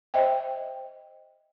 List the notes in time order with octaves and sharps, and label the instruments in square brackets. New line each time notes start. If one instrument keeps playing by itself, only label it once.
[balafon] C5 D#5 E5 G5